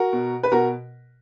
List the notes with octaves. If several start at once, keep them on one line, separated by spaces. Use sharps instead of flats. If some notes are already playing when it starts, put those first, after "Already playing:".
Already playing: F#4 A#4
B2
B4
B2 F#4 A#4